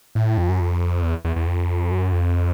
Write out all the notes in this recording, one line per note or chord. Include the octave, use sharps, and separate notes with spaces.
A2
F2
F#2
F2
E2
E2
E2
F2
F#2
F2